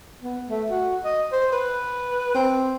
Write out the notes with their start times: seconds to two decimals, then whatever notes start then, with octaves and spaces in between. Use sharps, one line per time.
0.22 B3
0.49 A3
0.71 F#4
1.04 D#5
1.32 C5
1.52 B4
2.35 C4